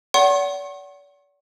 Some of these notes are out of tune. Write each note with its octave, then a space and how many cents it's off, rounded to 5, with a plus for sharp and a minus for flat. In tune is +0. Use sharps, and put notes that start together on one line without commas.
D5 -40 F#5 +20 C#6 -45